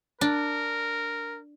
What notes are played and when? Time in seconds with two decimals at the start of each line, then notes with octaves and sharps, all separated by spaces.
0.21 D4 A#4